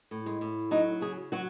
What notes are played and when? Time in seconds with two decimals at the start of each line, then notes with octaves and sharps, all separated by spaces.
0.11 A2
0.26 G#3
0.41 A2
0.71 F#3 D#4
1.01 C#3 G#4
1.32 F#3 F#4